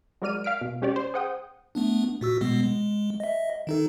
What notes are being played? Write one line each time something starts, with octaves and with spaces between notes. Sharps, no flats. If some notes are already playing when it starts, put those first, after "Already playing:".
F#3 G#3 A#4 D5 F6 D#7
F5 F6 B6 D7
B2
G#3 C#4 G4 C#5 D5
C5
G#4 C5 F#5 G5 D#6
A3 B3 D4
A#2 F#4 E6
B2 G#3 B3
G#3
D#5 E5
D#3 D#4 A4